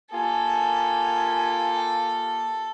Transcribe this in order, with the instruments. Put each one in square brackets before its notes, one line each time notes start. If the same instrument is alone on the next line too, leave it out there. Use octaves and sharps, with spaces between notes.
[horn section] A#3 F4 G4 [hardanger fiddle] A4 [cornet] G#5